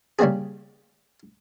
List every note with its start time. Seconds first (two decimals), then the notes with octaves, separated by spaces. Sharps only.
0.19 C#3 G3 A#3 C4 G#4